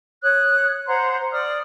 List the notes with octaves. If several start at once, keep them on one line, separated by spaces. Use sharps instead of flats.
C#5 D#6 F#6
C5 F#5 A#5 C6
D5 D#6 F6